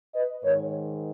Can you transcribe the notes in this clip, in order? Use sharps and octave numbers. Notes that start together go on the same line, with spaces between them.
B4 D#5
G#2 D#3 A#4 C#5